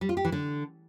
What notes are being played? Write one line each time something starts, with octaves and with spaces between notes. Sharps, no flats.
G3
F4
G4
E3
D3